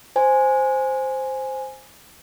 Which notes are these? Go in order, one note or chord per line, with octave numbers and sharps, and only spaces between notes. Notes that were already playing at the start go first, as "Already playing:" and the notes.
C5 G#5